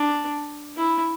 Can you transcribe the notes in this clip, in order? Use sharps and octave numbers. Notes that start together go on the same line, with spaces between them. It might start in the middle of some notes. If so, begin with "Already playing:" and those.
Already playing: D4
E4